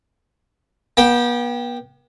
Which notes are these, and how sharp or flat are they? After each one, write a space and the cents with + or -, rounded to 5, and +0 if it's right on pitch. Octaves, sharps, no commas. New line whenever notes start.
B3 -40 G5 +0